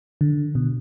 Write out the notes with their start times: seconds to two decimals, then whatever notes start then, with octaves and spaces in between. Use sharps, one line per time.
0.21 D3
0.55 B2